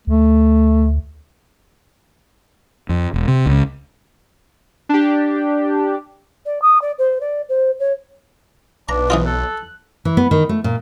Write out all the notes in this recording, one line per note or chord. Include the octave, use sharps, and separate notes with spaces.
D2 A3
F2
E1
C3
C#2
D4 G4
D5
D#6
D5
C5
D5
C5
C#5
B1 D4 B4 A#5
E3 C4 F4 B4 D#5
A4 F#6
E3
B3
D#3
A3
A#2